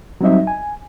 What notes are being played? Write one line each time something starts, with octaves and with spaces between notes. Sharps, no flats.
F#3 G3 C4 D#4 D#5 E5
G#5